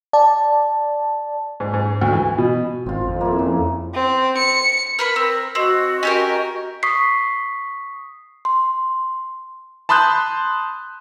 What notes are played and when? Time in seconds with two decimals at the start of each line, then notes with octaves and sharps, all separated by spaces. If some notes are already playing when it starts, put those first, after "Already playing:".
0.13 D5 A5
1.60 G#2
1.74 G#2
2.01 D2
2.13 E3
2.38 B2
2.86 G#1 C4 F4
3.07 F2
3.21 A#3 E4
3.39 C#3
3.94 C4
4.37 C#7
4.99 A#4 B4 B5
5.16 C4 A#4
5.55 C4 F#4 D#5
6.03 C#4 G4 A#4
6.83 C#6 D#6 B6 C7
8.45 C6
9.89 A5 B5 C6 D#6 F#6 G6